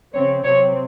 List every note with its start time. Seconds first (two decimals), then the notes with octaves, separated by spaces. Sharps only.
0.14 C#3 F3 C4 C#5
0.44 C3 F#3 C4 C#5